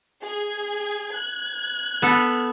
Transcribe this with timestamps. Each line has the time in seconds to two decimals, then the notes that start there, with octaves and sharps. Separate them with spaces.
0.23 G#4 G#6
1.10 F#6 G#6
2.02 B3 A4